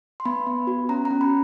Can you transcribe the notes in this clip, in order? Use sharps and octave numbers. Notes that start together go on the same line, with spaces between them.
C6
B3 B5
B3
F#4
C#4 A#5
A#5
C#4
B5